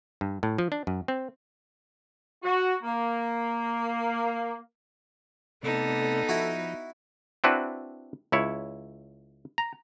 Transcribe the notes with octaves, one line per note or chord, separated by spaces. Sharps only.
G2
A2
F3
D4
F#2
C4
F#4
A#3
C3 A3 B3 D#4 A4 D5
F3 E4 F#4
C4 D4 E4 F#4 B4
C#2 E4 C#5
A#5